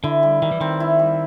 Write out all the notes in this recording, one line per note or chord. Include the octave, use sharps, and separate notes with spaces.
D3 E4
G3
D#3 G3
E3
D#3 C4
E4
G3